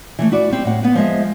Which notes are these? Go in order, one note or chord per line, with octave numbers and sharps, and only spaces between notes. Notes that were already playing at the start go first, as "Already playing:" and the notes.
E3 G#3 A3
E4 F#4 D5
G3 C4
A2 F#5
B3 B4
F3 G#3 E5